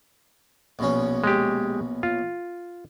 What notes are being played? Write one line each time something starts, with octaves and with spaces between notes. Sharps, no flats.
A#1 B2 C#4
G#3 G4
F4